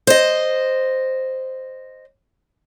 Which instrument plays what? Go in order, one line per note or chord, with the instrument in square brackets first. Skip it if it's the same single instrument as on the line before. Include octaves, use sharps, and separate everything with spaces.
[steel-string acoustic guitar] C5 D#5